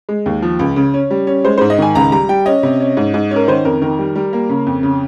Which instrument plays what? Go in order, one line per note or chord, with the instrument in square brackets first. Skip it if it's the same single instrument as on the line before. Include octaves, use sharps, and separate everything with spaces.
[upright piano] G#3
D#2
F3
C#2
C#3
C#4
G3
C#4
G#3 C5
G#2 C5
D#5
D#3 G#5
C#2 A#5
G3 A#5
G3 G5
C#4 D#5
C3
C#4
G#2
G#2
C#4
A#4
D#3 C5
F2 A#4
D#3 A#4
G3
G3
A#3
C#3
F2
C#3